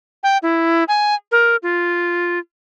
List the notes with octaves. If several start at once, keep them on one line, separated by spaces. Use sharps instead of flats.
G5
E4
G#5
A#4
F4